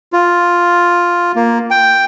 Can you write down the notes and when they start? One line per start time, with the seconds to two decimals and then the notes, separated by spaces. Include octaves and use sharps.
0.13 F4
1.36 A#3
1.71 G5